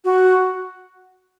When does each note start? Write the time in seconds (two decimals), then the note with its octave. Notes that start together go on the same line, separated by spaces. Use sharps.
0.05 F#4